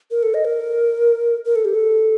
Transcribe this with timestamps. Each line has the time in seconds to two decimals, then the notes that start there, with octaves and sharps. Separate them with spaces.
0.11 A#4
0.23 A4
0.34 D#5
0.45 A#4
1.46 A#4
1.56 A4
1.65 G4
1.74 A4